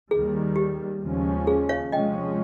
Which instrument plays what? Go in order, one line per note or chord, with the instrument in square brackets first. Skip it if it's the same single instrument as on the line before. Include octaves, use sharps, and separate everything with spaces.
[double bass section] D#2 D#3 G3 [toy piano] G#4
[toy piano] G4
[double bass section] D#2 C#3 F3 G#3 C#4
[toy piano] G#4
C#5 F5
[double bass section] C3 F3 G#3 C#4 [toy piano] D#5 G5